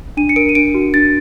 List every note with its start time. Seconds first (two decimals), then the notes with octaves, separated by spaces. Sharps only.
0.17 D4 D#7
0.29 C#7
0.36 A#4 D7
0.49 D#7
0.55 D4 D7
0.74 F#4
0.94 D4 A6